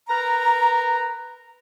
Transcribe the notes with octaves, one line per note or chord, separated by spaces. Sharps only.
A#4 B4 A#5